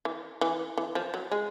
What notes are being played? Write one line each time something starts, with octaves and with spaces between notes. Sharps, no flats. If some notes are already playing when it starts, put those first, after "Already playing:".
E3
E3
E3
F3
F#3
G#3